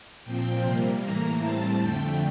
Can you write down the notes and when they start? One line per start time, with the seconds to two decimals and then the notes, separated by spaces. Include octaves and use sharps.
0.24 A#2 F3 C4 G5
0.63 C3 G3 A#3
1.02 A2 E3 A#3 A#5
1.41 A2 G3 C4 A5
1.80 F2 D3 A3 G5